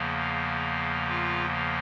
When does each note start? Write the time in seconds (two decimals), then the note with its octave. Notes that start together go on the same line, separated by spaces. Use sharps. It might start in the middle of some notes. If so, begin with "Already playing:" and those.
Already playing: E2 C#3 F3 A#3
1.09 F4